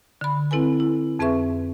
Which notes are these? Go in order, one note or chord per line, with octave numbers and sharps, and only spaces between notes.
D3 B5
C4 E4 A4 B4 G#5
E4
F2 C4 G#4 B4 E5 C#6